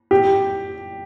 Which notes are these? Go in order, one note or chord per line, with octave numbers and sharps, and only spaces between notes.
G4